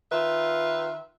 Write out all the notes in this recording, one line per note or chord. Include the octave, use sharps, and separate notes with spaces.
D#3 F4 B4 E5